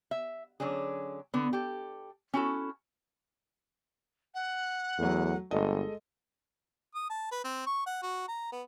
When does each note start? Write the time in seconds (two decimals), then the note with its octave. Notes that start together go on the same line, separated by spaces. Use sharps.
0.11 E5
0.60 D3 F#3 C#4 D4 G#4
1.34 D3 B3
1.53 G4 A4
2.34 C#4 E4 F#4 A4
4.34 F#5
4.98 E2 F#3 A3
5.51 G1 G#3 A4 D#5
6.95 D#6
7.10 A5
7.32 B4
7.45 C4
7.66 C#6
7.86 F#5
8.03 F#4
8.28 A#5
8.52 B3